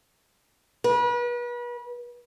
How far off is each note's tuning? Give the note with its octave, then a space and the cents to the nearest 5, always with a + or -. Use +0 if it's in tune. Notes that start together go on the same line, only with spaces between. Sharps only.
B4 -35